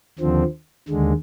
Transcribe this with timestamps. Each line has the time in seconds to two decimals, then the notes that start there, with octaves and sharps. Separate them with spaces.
0.19 D#2 D3 F3 C4
0.88 D#2 D3 G#3